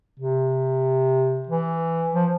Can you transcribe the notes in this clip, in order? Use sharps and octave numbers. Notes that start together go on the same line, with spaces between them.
C3
E3
F3